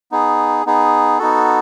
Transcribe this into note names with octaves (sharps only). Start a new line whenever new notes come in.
B3 D#4 G#4
B3 D#4 G#4
B3 D#4 F#4 A4